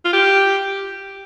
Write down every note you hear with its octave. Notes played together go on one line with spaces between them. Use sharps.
F4
G4